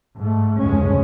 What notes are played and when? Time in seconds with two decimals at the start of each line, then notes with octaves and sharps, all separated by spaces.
0.17 G#2 A3
0.59 F1 D2 G2 C#3 G#3 C#4